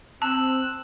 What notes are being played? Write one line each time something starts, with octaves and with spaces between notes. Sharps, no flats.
C4 A5 E6 F#6